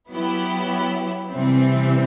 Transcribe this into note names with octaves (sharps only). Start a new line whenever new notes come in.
F#3 B3 E4 G4
C3 E3 G3 C4